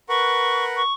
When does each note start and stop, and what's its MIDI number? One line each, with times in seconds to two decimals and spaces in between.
0.09 0.82 70
0.09 0.82 71
0.09 0.82 78
0.09 0.65 85
0.76 0.94 85